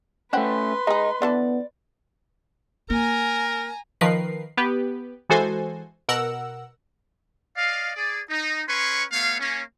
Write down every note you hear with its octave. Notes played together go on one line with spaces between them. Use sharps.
A3 C#4 B4 C5 F#5 G5 C6
G#3 G#4 D#5 A#5
D3 E3 B3 D5 A5
A#3 A#4 G#5 A#5
D#3 F3 A#4 B4 C7
B3 G4 B4
E3 G#3 F#4 A4 C5 G#5
B2 A#4 F#5 E6
D5 D#5 F5
G#4 D5
D#4
C#4 B4 C#5 C6 C#6
A3 B3 C#5 F5
A#3 C#4